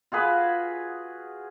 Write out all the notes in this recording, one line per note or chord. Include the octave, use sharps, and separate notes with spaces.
F4 F#4 G#4 B4